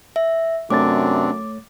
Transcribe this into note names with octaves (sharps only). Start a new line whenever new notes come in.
E5
F#2 C3 A3 C4 D4 C#5 D6 A6